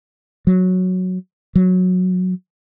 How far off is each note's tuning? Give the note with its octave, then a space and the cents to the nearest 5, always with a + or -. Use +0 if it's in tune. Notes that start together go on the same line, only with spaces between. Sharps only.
F#3 -5
F#3 -15